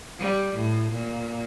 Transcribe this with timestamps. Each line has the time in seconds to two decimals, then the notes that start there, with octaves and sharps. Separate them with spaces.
0.19 G3
0.56 A2
0.93 A#2